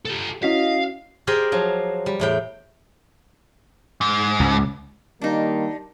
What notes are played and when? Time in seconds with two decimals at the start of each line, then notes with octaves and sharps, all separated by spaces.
0.05 G4 A4
0.43 C#4 E4 F#4 D#5 F5 B6
1.27 G4 G#4 A#4 C5 D5 D#5
1.52 F3 F#3
2.06 G3
2.20 E2 A2 G5
4.01 G#2
4.40 C#2
5.21 D#3 G3 A#3 D4 D#4